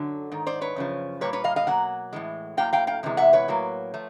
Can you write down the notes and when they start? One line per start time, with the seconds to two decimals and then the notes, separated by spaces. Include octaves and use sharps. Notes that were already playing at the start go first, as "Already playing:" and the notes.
Already playing: F#2 D3 F#3
0.32 G#2 D#3
0.47 C5 D5
0.61 B4 C#5
0.76 F#2 C#3 F3
1.21 A#2 G3 A#3 B4 C#5
1.33 B4 C#5
1.44 D#5 F5
1.56 D#5 F5
1.67 B2 F#3 A#3 F#5
2.13 A2 E3 G#3
2.57 A2 F#3 A#3 F5 G5
2.73 F5 G5
2.87 F5 G5
3.03 E2 C3 E3 G#3
3.17 E5 F#5
3.33 B4 C#5
3.48 A2 F#3 A#3
3.94 F3 A3